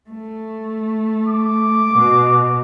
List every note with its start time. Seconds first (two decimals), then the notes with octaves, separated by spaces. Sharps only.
0.10 A3
1.28 D6
1.93 B2